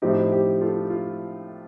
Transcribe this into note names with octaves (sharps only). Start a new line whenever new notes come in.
A2 F3 C4 D#4 G4
G4
F4 A4
F4